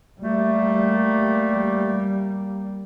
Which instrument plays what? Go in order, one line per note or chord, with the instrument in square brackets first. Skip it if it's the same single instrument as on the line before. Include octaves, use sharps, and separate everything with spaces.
[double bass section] G3 A#3 [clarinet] A3